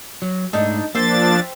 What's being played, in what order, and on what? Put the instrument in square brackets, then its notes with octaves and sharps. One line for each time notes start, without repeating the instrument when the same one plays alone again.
[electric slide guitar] F#3
[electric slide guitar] G#2 A3 [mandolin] D4 D#4
[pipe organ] F3 D4 A6 [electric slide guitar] A#3 [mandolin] C5 E5 G5